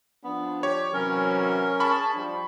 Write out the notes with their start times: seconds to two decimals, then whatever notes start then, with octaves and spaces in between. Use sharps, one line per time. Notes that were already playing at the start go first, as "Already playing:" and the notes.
0.24 F3 B3 D4
0.63 G4 C#5
0.93 C3 E3 F#3 C#4 A#4
1.80 G#4 A5 B5 C#6
2.14 F3 G3 D4